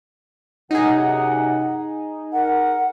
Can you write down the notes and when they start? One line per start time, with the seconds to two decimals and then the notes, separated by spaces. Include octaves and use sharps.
0.71 F#2 C3 D#4 G#4 F#5
2.33 A#4 F#5